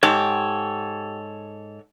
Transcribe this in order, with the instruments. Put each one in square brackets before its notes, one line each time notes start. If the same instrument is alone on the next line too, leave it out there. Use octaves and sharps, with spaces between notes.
[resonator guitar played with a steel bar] G#2 [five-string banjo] G4 [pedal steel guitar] A4 C#5